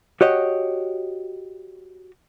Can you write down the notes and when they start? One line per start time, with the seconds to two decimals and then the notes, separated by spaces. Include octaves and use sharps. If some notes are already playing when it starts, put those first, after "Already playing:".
0.21 F#4 G4 C#5 D#5